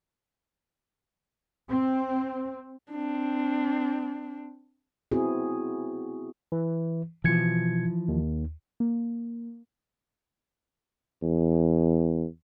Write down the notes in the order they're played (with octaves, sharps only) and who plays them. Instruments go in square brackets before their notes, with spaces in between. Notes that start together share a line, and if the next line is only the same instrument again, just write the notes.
[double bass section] C4
[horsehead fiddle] C4 D4
[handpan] B3 C4 E4 F#4 G#4
[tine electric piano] E3
[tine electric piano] B2 G#6 C#7 [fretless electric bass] E3 F3
[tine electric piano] D#2
[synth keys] A#3
[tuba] E2